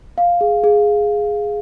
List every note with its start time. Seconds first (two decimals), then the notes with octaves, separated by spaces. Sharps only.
0.18 F5
0.41 G#4
0.64 G#4